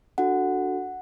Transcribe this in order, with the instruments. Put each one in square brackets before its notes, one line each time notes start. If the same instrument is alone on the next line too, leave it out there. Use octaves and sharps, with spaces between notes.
[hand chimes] D4 F#4 A4 F#5